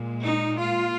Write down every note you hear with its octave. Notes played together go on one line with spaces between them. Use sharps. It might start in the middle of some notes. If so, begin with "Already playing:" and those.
Already playing: A#2 G#3
D#4
F4